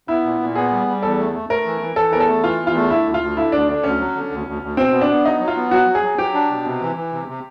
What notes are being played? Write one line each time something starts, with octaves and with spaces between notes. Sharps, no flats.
B3 E4
A#2
A#2
B3 G#4
G3
G3
E2 A4
A3
A3
A3 A#4
E3
E3
E3 A4
E2 A#4
A4
A3
E3 F4
E2
F4
A3
D3 E4
D2
F4
D2
D3 E4
D2 D4
D3 D4
D2 C#4
F#3
D3
D2
D2
D2
B2 C4
B3
D4
B3
F#3 D#4
F#3
F4
B3
F#3 F#4
F#3
G#4
F#3
F#3 G4
D4
B2
C3
E3
E3
C3
C3